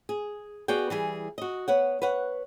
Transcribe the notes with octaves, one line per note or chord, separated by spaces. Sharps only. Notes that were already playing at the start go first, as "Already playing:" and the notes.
G#4
B3 F#4 G#4 D5 G5
E3 G3 G#4
F#4 D#5
B3 C#5 F#5
B4 C#5 F#5